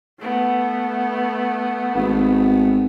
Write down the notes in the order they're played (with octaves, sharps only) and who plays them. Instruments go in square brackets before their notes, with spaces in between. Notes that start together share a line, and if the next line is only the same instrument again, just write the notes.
[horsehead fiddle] A3 B3
[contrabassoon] G#1